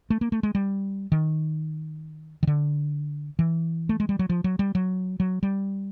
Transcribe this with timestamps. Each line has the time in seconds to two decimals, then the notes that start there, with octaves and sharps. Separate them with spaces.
0.10 A3
0.21 A#3
0.32 A3
0.43 G#3
0.55 G3
1.12 D#3
2.43 D#3
2.47 D3
3.39 E3
3.89 A3
4.00 G#3
4.09 G3
4.19 F#3
4.30 F3
4.44 F#3
4.59 G3
4.75 F#3
5.20 F#3
5.43 G3